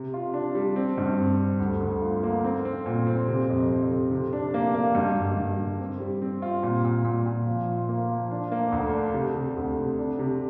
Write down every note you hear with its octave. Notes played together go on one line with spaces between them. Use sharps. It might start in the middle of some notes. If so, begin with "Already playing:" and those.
Already playing: C3
F4
D4
G3
C4
G2
C4
C4
D2
D2
F4
A#3
C4
C4
A#2
C4
C3
F2
F2
C3
C3
D4
A#3
A#3
G2
G2
G2
G2
C4
G3
C4
F4
A#2
A#2
A#2
A#2
F3
F4
A#3
F3
D4
A#3
D2
D4
C3
C3
D2
C3
D4
C3